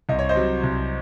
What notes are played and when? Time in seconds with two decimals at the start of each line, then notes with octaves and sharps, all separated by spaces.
0.09 C2 D#5
0.19 C#5
0.29 C5 D#5
0.36 C3 F#3
0.63 C2